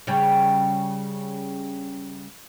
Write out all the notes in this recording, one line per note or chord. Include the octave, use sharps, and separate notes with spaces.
C#3 G3